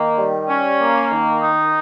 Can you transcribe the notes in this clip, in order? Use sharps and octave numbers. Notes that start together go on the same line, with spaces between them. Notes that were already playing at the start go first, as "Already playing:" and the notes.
Already playing: D#3 A#3
G3
C#4
A#3
D#3
D#4